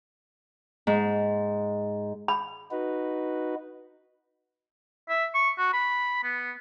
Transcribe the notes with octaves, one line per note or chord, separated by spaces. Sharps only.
G#2
B5
D#4 F#4 B4
E5
C#6
F#4
B5
B3